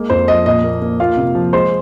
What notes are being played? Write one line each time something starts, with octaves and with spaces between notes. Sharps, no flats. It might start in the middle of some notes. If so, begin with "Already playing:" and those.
Already playing: G#3 A#3
F2 C5
F3 D#5
A#2 D#5
A#3
A#3
A#3 F4 F5
C3
F3
G#3 C5 C6